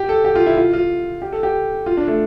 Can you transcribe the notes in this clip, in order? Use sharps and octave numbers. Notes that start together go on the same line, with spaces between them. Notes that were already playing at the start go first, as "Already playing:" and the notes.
Already playing: G4
A4
G4
F4
E4
F4
F4
G4
A4
G4
F4
D4
A3